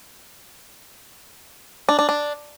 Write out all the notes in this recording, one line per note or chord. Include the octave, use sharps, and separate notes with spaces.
D4
D4
D4